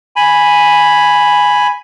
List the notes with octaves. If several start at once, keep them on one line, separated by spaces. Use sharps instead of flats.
G#5 B5